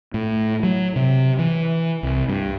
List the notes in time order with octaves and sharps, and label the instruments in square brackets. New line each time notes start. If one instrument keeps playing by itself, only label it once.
[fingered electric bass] A2
F#3
C3
E3
C2
G2